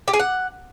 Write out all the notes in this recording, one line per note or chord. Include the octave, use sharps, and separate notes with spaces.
G4
G#4
F#5